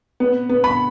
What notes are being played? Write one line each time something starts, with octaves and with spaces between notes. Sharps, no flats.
B3
B3
B5